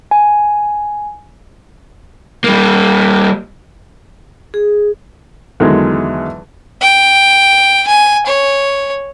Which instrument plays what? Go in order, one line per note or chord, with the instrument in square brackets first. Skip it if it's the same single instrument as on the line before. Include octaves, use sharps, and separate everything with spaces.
[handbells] G#5
[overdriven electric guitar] G3 A#3
[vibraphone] G#4
[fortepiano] E2 D3 D#3 F#3 G#3
[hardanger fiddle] G5
G#5
C#5